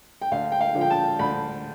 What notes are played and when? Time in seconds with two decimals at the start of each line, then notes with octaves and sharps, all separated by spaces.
0.22 G5
0.31 D2 F5
0.52 G5
0.61 F5
0.75 D3 F3
0.81 G5
0.90 A5
1.19 D2 B5